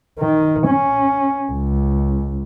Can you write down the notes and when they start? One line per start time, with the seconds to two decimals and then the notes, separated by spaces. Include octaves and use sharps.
0.19 D#3
0.67 C#4
1.52 C#2